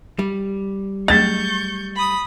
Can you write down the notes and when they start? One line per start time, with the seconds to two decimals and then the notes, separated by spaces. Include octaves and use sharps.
0.19 G3
1.08 F#3 A3 G#4 C#6 G6 A6
1.96 B5 D#6